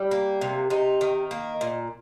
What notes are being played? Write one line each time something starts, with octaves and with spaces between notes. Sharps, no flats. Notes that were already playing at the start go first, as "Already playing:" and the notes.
Already playing: G3 G4
A#3
C3
C3 D#4
D#3
A#3
A#2